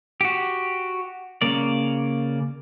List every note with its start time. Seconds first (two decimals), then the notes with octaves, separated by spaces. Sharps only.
0.21 F#4 G4
1.42 C#3 A#3 D5